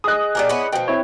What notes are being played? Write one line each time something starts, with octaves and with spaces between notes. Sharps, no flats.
G#4 D#5 D#6 F#6
A#2 G4 A#4 G#5
B3 C#4 E4
B2 F3 G5
C4 E4 C#5